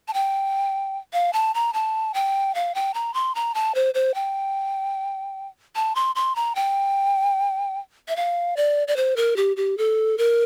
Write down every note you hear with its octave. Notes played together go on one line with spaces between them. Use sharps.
A5
G5
F5
A5
A#5
A5
G5
F5
G5
A#5
C6
A#5
A5
C5
C5
G5
A5
C6
C6
A#5
G5
E5
F5
D5
D5
C5
A#4
G4
G4
A4
A#4